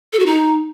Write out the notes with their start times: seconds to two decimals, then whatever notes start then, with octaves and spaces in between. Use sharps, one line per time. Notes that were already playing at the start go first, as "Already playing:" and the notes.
0.13 A4
0.19 F#4
0.26 D#4